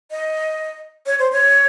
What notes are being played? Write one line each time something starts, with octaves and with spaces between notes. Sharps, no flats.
D#5
C#5
C5
C#5